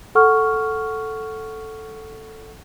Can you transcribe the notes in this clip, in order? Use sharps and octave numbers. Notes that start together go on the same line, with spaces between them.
A4 F#5 C#6 F6